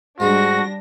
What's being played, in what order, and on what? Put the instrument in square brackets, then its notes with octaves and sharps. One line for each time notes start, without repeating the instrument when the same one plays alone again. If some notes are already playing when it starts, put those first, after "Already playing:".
[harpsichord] G#2 G#3 [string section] G3 D4 A#6 [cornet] F#4